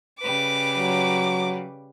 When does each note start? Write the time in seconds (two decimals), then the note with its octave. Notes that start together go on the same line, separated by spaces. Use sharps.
0.20 C#3 G3 B4 D6
0.75 F#3